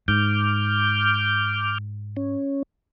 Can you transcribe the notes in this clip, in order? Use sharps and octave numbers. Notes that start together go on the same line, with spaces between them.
G#2 D6 F6 G6
C#4